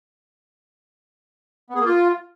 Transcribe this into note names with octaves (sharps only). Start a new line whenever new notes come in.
B3
G#4
A#3
F4